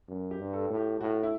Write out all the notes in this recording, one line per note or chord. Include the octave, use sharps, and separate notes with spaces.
F#2
G4
G2
A4
A2
G4
A2 F#4
E4